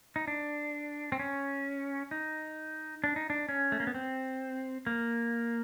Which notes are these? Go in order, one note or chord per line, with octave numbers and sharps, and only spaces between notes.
D#4
D4
C4
C#4
D#4
D4
D#4
D4
C#4
A3
A#3
B3
C4
A#3